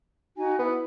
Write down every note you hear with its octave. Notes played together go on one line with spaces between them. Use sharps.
D#4 F#4 G#5
B3 E4